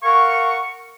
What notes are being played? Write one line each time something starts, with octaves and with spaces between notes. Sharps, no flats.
A#4 F5 F#5 C#6